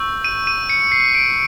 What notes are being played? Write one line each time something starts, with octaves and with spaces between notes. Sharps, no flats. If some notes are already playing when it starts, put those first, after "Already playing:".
Already playing: C#6 E6 G6
D#7
D#7
C#7
C7
D7